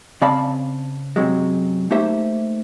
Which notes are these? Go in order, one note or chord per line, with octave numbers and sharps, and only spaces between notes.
C#3 C4 D5 F5 A5 B5
F#2 C3 F#3 G#3
A3 A#3 D#4 G4 C5 E5